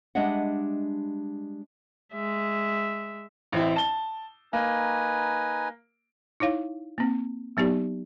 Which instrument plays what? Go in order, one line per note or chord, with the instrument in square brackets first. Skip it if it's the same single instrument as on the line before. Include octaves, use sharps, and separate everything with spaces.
[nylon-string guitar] G3 G#3 D4 D#5 E5 F#5
[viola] G#3 E5
[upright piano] A1 C4 E4
A5 G7
[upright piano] A#3 [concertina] D#4 B4 G#5
[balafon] D#4 E4 C#5 F5
A#3 C4
F#3 B3 D#4 G4 D5